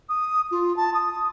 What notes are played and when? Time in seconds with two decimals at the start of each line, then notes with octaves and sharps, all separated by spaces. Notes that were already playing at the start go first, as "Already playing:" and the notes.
0.09 D#6
0.51 F4
0.77 A5
0.94 D#6